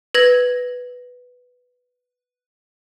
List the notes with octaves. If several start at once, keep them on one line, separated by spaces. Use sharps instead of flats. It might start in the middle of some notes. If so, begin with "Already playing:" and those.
B4 G#6 A#6 F#7